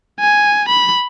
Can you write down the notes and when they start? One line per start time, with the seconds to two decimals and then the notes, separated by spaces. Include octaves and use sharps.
0.20 G#5
0.69 B5